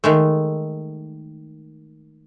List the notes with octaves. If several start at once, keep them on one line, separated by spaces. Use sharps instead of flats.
D#3 G#3 A3